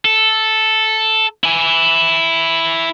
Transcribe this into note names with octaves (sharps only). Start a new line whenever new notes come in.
A4
E4 G#5